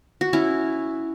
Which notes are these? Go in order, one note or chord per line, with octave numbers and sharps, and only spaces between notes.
F#4
C#4 E4